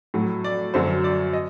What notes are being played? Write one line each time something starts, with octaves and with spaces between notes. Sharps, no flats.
A2 F#3
D5
F#2 D3 F#3 C5
D5
D#5